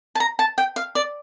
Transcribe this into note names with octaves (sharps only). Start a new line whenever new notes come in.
A5
A#5
A5
G5
F5
D5